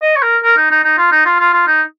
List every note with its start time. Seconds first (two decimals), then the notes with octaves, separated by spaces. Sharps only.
0.02 D#5
0.16 C#5
0.23 A#4
0.44 A#4
0.57 D#4
0.71 D#4
0.84 D#4
0.98 F4
1.12 D#4
1.26 F4
1.40 F4
1.54 F4
1.67 D#4